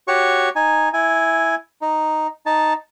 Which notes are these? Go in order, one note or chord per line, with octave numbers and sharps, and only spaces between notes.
F#4 G4 C#5 C#6
D#4 G#5
E4 G#5
D#4
D#4 A5